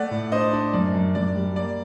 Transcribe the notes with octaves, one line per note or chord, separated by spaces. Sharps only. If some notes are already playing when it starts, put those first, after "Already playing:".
Already playing: A3 D5 F#5
A2
D4 C5 D#5
D4
F#2 D5
F#2
F#2 D5
G3
A#3 D5